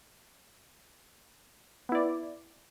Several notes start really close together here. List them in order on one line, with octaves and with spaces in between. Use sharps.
B3 E4 D5